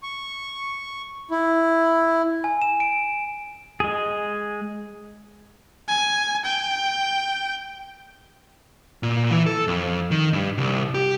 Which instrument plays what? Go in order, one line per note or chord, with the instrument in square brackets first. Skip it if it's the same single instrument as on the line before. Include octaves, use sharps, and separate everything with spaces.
[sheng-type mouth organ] C#6
E4
[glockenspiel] G#5
E7
D7
[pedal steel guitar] G#3 G#4
[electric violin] G#5
G5
[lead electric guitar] A#2
E3
A4
F2
D#3
G2
C2
G4